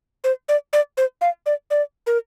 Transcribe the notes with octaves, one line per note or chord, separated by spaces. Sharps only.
C5
D5
D5
C5
F5
D5
D5
A#4